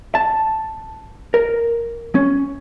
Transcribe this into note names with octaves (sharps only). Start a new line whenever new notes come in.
A5
A#4
C#4